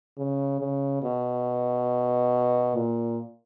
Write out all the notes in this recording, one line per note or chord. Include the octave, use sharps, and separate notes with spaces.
C#3
C#3
B2
A#2